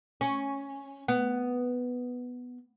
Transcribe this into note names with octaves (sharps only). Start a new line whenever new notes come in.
C#4
B3